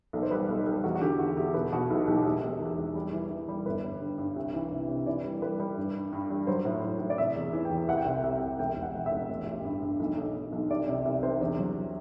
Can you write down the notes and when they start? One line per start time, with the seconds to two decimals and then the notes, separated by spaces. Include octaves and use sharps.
0.13 B1 A4
0.23 C5
0.31 G3 B4
0.48 B1 A4
0.66 G3 A4
0.84 E2 F#4
0.95 F#4
1.02 D3 G4
1.19 E2 F#4
1.37 E2 G4
1.54 B2 B4
1.72 B2 F#4
1.90 B1 E4
2.07 B1 G4
2.25 E1 G4
2.43 E1
2.60 E2
2.78 E1
2.95 G3
3.13 E3
3.30 E3
3.48 G3
3.66 G1 B4
3.83 G1
4.01 G2
4.18 G2
4.36 C2
4.54 E3
4.72 C3
4.89 C3
5.06 E3 D5
5.24 G3
5.42 G3 B4
5.60 G3
5.77 G2
5.95 G2
6.13 G2
6.30 G3
6.47 F#3 C5
6.65 A2
6.83 F#3
7.00 A2
7.10 D5
7.18 C3 E5
7.36 E2
7.53 E3
7.65 G5
7.71 E2
7.88 C2 F#5
7.98 G5
8.06 C3 F#5
8.24 C2
8.41 C2
8.59 E1 G5
8.77 E1
8.82 F#5
8.94 E1
9.06 E5
9.12 E1
9.29 A1
9.47 A1
9.65 G2
9.82 G2
10.00 B1
10.18 B1
10.36 B1
10.52 B1
10.70 C2 D5
10.88 C3 D5
11.05 C2 D5
11.23 C3 C5
11.41 E2 D4
11.59 F#3